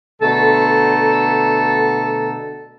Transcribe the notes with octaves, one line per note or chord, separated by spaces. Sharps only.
B2 D3 A3 A4 A#5